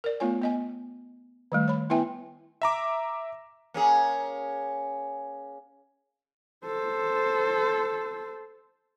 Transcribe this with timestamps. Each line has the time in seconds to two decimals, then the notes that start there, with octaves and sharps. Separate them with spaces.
0.04 A#4 D5
0.20 A3 B3 F4 C#5 G#5
0.42 B3 D#5 G#5
1.52 D#3 G3 A3
1.68 C#5 B5
1.90 B3 E4 B4 E5 G5 G#5
2.62 E5 A#5 D6
3.74 A#3 C#4 G#4
6.65 A4 C5